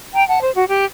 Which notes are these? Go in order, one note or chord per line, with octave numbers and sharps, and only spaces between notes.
G5 A#5
F#5 A5
C5
F#4
G4